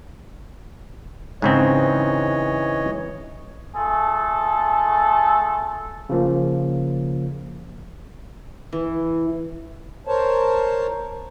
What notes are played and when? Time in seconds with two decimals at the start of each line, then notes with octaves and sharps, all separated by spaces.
1.42 G#2 C#3 E3 C4 C#5 D#5
3.75 A3 F4 G#4 A4
6.09 C#3 F3 A#3
8.73 E3
10.07 A#4 C5 C#5 A5